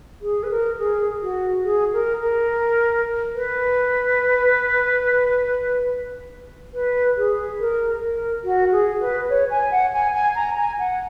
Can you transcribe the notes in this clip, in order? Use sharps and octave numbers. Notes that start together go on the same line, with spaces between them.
G#4
B4
A#4
G#4
F#4
G#4
A#4
A#4
B4
B4
G#4
A#4
A#4
F#4
G#4
B4
C#5
G#5
F#5
G#5
G#5
A#5
G#5
F#5